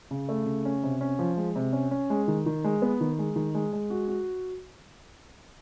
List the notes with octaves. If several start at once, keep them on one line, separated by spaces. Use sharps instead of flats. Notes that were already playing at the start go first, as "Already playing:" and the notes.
C#3
A3
C#3
C#4
C3
C#4
F3
G#3
C3
C#4
C#4
G#3
D#3
D#3
G#3
B3
D#3
G#3
D#3
G#3
G#3
F#4
F#4